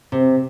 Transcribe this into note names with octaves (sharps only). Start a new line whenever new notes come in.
C3